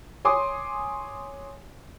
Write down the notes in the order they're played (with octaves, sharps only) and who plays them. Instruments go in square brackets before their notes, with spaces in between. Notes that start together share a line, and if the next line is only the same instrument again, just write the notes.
[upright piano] C#5 G#5 C6 D6 D#6